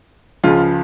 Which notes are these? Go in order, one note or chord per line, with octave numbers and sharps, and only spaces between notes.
C#2 C#3 F3 F4